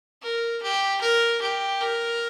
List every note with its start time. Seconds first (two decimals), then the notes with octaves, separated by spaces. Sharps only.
0.22 A#4
0.62 G4
1.01 A#4
1.41 G4
1.80 A#4